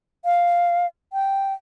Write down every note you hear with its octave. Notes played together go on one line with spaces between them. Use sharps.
F5
G5